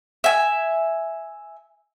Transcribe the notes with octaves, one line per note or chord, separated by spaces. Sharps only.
E5 G#5